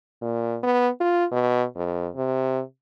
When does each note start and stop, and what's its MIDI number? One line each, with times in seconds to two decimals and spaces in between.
0.22 0.58 46
0.63 0.89 59
1.00 1.25 65
1.32 1.65 47
1.76 2.08 41
2.16 2.62 48